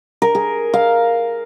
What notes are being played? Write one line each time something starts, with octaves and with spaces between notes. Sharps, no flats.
A#4
G#4
F5